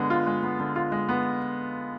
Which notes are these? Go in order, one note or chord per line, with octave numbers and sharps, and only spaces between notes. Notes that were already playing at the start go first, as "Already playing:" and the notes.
Already playing: D3 G#3 B3
F4
G#3
B3
D3
F4
G#3
B3